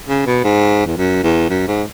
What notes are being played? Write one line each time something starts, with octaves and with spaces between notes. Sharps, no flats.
C#3
B2
G#2
E2
F#2
E2
F#2
G#2